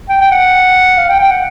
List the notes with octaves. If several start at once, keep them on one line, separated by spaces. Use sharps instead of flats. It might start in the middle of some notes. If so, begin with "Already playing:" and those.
G5
G5
F#5
F5
G5
G5
F#5